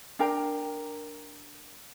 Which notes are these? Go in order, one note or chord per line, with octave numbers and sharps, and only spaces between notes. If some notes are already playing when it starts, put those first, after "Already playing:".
D4 A#4 G5 A#5